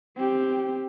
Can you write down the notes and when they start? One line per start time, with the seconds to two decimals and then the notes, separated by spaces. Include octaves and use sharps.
0.17 C4 G4